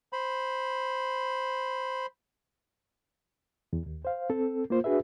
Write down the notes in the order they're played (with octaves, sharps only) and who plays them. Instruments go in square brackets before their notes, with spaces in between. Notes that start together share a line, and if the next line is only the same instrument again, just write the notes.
[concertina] C5 B5
[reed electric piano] E2
D#2
C5 F5
C4 A4
A#3 F4 C5
D4 F#4 G#4 B4 E5